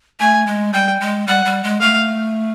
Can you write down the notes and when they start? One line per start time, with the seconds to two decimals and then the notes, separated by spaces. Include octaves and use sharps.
0.20 A3 G#5
0.47 G#3
0.73 G3 G5
1.01 G#3
1.27 G3 F#5
1.45 G3
1.64 G#3
1.80 A3 F5